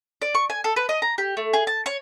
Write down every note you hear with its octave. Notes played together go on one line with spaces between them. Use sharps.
D5
C#6
G#5
A4
B4
D#5
A#5
G4
A3
G#4
A5
C#5